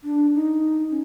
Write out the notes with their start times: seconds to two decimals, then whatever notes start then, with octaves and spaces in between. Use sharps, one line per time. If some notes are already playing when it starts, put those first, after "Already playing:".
0.04 D4
0.35 D#4
0.91 C#4